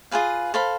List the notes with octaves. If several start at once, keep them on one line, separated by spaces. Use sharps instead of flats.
F4 G#4 B4 F5
A4 C5 F5 B5